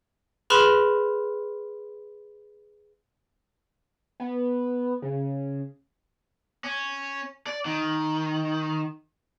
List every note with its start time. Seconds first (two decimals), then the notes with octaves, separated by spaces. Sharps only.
0.50 G#4 B4 B5 C6 F6 E7
4.20 B3
5.02 C#3
6.64 C#4
7.47 D5
7.65 D#3